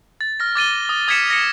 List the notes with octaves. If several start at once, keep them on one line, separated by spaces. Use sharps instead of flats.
A6
F6 A#6
D6 A6 D#7 G7
D#6
D#6 G#6 A6 B6 C#7 E7
A#6 C#7